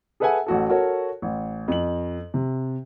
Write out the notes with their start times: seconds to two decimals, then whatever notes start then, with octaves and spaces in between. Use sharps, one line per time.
0.20 G#4 A4 B4 E5 F#5 G#5
0.46 A1 F#4 A4
0.69 F#4 A4 A#4 C#5
1.22 A1
1.68 F2 F#7
2.34 C3